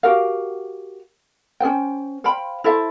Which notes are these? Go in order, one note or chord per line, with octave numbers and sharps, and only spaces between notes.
F#4 G4 A#4 F5
C#4 G#4 C5 G5
C5 F5 G5 B5
E4 A4 C5 E5